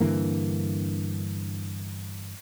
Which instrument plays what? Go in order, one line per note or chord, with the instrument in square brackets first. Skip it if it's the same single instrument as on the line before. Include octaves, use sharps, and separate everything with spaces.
[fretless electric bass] G2 D3 E3 A#3